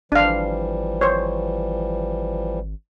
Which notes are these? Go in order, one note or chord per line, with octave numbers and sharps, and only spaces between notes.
G#1 E3 F3 G3 D4 F5
C5 C#5